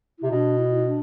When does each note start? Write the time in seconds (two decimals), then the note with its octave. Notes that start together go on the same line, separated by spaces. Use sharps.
0.19 C3 E4
0.31 B2 D4
0.58 E4
0.74 E4
0.85 D4